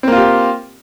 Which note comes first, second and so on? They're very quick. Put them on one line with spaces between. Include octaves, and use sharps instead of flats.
C4 A#3 F4 G4